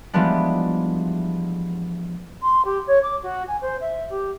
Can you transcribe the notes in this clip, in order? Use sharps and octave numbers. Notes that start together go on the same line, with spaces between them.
E3 F3 G3 G#3 B3 D4
C6
G4
C#5
D6
F#4
G#5
C5
E5
G4